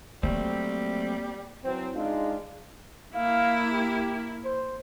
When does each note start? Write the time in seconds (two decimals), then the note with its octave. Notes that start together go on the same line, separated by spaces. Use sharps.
0.23 F#3 G3 A3 A#3 C4
1.64 E3 F#3 C4
1.94 G#3 D4 D#4 F4
3.15 A#3 E4 F5
3.71 G4
4.45 C5